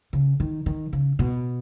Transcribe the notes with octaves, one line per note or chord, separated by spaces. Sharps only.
C#3
D#3
D#3
C#3
B2